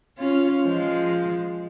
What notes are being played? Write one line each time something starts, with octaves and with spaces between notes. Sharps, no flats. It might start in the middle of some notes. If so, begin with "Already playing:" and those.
C#4 F4
F3 G#3